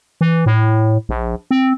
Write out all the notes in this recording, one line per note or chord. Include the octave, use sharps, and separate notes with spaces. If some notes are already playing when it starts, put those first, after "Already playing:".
E3
A2
A#1
C4